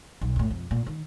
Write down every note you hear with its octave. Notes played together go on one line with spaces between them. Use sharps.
B1
E2 A2
F2
A#2
D#3